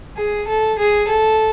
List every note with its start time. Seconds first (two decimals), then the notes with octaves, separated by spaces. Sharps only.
0.17 G#4
0.48 A4
0.78 G#4
1.08 A4